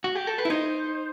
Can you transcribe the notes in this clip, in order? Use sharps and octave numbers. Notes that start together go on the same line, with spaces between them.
F#4
G4
A4
B4
E4
D#4 C5